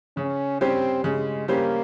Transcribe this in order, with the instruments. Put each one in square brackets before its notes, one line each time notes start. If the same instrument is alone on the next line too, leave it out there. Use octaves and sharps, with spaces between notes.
[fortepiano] C#3 [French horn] C#4
[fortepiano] G3 C#4 G4 C5 [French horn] C4
[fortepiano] C#3 [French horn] G#3
[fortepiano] G3 C#4 G4 C5 [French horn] A#3